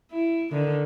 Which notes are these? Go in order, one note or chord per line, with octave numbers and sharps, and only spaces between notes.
E4
D3 D#3